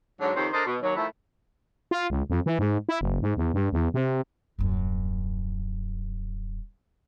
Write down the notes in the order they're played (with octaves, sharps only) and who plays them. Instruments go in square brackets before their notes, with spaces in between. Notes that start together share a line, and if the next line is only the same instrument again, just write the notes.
[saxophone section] G#2 D3 F#3
F2 D#3 G4 C5 C#5
D4 A4 A#4 C5 D#5
B2
D#2 F#3
D#3 F3 A3 E4
[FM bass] F4
C#2
F2
E3
G#2
E4
F#1
G#2
E2
G2
E2
C3
[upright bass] D#1 F#2